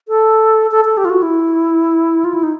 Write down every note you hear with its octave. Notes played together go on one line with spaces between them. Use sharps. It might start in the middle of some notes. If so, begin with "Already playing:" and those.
A4
A4
A4
G4
F4
F#4
E4
F4
E4
D#4